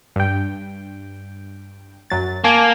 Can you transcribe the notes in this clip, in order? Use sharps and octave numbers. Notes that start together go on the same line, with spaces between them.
G2 G5
F#2 F#3 A6
A#3 G#5 A5 G#6